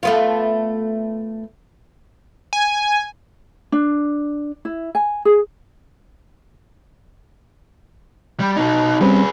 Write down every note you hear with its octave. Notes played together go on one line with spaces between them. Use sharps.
A3 B3 F4
G#5
D4
E4
G#5
G#4
G3
B2 D#4
G3 C4 C#4 G#4 B4